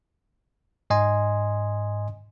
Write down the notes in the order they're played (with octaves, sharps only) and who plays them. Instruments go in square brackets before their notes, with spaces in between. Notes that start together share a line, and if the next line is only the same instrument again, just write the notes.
[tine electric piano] G#2 D#5 G#5 C6